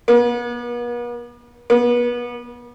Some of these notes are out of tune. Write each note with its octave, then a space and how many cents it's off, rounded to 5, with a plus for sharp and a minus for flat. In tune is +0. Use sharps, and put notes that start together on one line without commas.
B3 -45
B3 -35